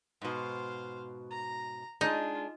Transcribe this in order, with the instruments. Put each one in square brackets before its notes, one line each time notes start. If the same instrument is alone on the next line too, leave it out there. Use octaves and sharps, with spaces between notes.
[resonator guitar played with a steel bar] G#2 B2 [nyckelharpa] C5 F5
[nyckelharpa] A#5
[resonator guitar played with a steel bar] G#3 D4 [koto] D#4 [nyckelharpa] F4